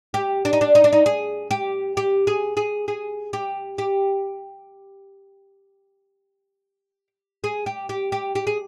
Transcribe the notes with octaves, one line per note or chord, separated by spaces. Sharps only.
G4
D4
D#4
D4
D#4
D4
D#4
G#4
G4
G4
G#4
G#4
G#4
G4
G4
G#4
G4
G4
G4
G4
G#4